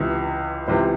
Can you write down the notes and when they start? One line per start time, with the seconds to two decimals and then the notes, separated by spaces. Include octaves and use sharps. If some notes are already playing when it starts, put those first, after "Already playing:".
Already playing: C#2 C3 E3
0.68 C#2 C3 E3 C5